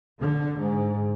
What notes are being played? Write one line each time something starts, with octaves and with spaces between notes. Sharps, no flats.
D3
G#2